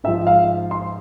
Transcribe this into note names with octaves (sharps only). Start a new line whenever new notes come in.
G#2 F3 E5
F5
C6